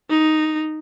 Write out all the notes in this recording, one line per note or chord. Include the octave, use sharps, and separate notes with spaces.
D#4